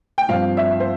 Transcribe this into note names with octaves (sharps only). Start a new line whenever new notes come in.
G5
G2 F3 C4 F5
E5
C5